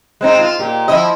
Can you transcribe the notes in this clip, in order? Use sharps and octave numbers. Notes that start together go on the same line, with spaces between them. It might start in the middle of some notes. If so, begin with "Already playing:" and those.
G#3 C4 D#4
F4
A#2 G4
F3 E4 D#5